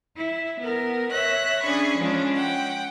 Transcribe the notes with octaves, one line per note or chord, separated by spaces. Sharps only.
E4
B3 A#4
C#5 E5 F#6 A#6
C#4 D4 G#4 B5 C#6
F3 G#3 C#4 D4
F#5 G5